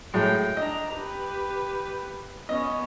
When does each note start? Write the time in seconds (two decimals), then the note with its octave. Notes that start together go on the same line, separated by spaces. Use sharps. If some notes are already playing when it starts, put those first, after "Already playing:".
0.14 A2 F#3 G#3 G5
0.57 D4 D#5 A#5
0.95 G4 B4
2.49 B3 C#4 D#5